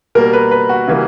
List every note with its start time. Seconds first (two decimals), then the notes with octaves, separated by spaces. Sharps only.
0.15 B2 G3 A#3 A#4
0.33 B4
0.51 B4
0.69 F#4
0.88 C#3 E3 G3 A#3